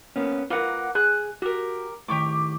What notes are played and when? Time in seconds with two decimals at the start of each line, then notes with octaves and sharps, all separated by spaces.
0.16 A#3 B3 C#4
0.50 A#3 F4 A#4 B4 F#5
0.95 G#4 F#6
1.42 F#4 G4 A#4
2.08 A2 D#3 G4 C#6 D6